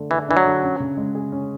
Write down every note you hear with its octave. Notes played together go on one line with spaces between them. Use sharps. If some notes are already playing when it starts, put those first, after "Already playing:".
Already playing: D3 A3 D4
E3 G#4
E3 D4
F#3
D3
C#4
C#3
G#3
G#4
C#4